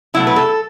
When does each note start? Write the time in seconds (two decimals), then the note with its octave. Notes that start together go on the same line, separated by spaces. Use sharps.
0.14 B2 F#3 A3 E4
0.27 B4
0.36 A4